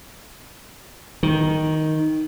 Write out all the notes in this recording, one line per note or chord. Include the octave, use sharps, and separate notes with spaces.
D#3